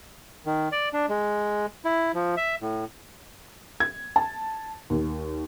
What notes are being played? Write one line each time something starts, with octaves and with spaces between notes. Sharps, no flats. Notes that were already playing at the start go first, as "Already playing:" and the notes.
D#3
D5
D4
G#3
E4
F3
E5
A2
G#6
A5
D#2